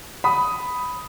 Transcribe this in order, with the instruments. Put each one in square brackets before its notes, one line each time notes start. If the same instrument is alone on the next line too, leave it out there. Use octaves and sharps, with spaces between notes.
[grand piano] B5 D#6